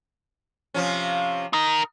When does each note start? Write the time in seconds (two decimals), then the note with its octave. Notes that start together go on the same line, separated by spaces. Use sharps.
0.74 C3 F3 C#4
1.53 D#4 A#4